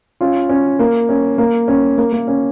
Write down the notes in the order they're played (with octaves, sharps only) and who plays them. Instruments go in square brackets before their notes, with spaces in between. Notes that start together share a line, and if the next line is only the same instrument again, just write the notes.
[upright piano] C#4 F4
C#4
A#3
C#4
A#3
C#4
A#3
A#3
C#4